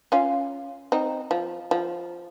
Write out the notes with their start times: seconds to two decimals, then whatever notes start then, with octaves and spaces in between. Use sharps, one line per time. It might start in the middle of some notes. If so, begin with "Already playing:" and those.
0.12 C#4 F4
0.92 C4 D#4
1.31 F3
1.71 F3